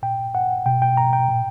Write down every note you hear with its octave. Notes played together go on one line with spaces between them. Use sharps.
A#2 G5
F#5
B2 G5
G5
A#5
G5
A#2